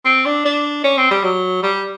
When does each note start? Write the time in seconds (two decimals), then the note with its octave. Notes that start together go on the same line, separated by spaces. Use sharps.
0.05 C4
0.26 D4
0.46 D4
0.84 C#4
0.98 C4
1.11 G3
1.24 F#3
1.63 G3